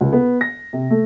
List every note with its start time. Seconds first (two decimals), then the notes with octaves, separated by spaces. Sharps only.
0.01 C#2
0.13 B3
0.41 A#6
0.73 C3
0.91 A3